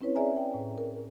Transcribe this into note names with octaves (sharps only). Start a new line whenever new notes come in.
C4 C#4 E4 B4 C#5
G#4 D5 E5 G#5 A#5
G5
A2
A#4